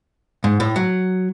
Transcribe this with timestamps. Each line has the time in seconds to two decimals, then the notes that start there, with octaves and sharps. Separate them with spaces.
0.44 G#2
0.60 A2
0.76 F#3